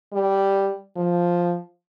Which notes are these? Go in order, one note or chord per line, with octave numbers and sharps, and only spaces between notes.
G3
F3